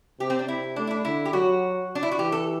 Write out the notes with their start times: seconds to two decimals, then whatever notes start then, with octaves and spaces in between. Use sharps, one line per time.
0.20 C3 G4
0.30 C4
0.39 D4
0.48 C3 E4
0.76 A3 D4
0.87 E4
0.91 D4
1.05 D3 E4
1.25 G4
1.33 F#3 F#4
1.95 D4
2.03 E4
2.11 F#4
2.19 E3 G4
2.32 A4